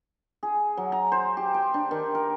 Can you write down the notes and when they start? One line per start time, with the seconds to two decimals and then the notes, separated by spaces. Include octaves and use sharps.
0.43 G#4
0.77 F#3
0.92 A#5
1.12 C5
1.37 G4
1.54 G5
1.74 D4
1.91 D#3
2.15 A#4